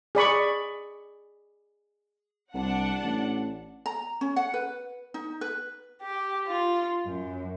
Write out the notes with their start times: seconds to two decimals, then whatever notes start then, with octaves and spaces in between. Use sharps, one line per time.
0.15 G#4 D5 B5 C#6
2.54 C2 D4 F#5
3.03 A1
3.86 A#5
4.21 C#4
4.36 F#5
4.54 B4
5.14 D#4
5.41 B4
6.01 G4
6.46 F4
7.06 F#2